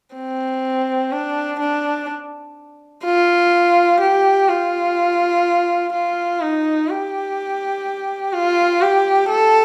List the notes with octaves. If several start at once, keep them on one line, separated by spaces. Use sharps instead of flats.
C4
D4
D4
F4
G4
F4
F4
D#4
G4
F4
G4
A4